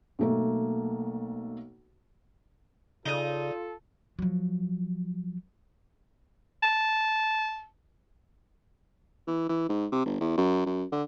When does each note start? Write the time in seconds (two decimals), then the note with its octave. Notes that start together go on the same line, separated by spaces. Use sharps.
0.19 B1 A3 A#3
3.06 C#3 D#4 F4 A4 D5 D#6
4.19 F3 F#3
6.63 A5
9.27 E3
9.49 E3
9.69 G#2
9.92 C3
10.06 G1
10.21 E2
10.38 F#2
10.66 F#2
10.92 D3